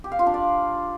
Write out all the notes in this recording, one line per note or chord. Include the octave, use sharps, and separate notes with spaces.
G4
F5
F4
D4
D5